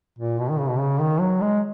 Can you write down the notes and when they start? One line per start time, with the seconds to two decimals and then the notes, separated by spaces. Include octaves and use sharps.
0.19 A#2
0.40 B2
0.50 D#3
0.59 C#3
0.70 B2
0.80 C#3
1.00 D#3
1.21 F#3
1.41 G#3